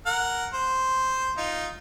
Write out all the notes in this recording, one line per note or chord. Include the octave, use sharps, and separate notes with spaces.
A#4 F#5
C5
D#4 F4